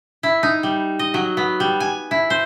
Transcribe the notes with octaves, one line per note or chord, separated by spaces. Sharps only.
E4
D#4
G3
D#5
F#3
B3
G3
G#5
E4
C5